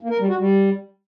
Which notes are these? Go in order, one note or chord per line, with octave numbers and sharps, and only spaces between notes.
A#3
A#4
G3
F#4
G3